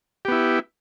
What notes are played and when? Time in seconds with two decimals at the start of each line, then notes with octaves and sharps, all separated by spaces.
0.25 G4
0.28 B3
0.32 E4